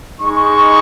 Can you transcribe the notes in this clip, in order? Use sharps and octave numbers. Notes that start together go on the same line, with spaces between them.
G#3 D#4 C#6